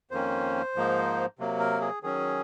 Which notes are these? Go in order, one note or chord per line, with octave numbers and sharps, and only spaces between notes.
F2 D#3 A#3 C#4 C5
G#2 F3 A#3 D#4
C3 F#3 A#3
A#4
G#4
D#3 F#3 C#4 G#4